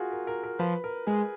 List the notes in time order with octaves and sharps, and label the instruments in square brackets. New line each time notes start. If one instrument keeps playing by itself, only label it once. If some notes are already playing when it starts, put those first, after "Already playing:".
Already playing: [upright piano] F4 F#4 G#4 A#4
A#4
A#4
A#4
[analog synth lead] F3 [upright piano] B4
[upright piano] A#4
[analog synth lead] G#3 [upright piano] G#4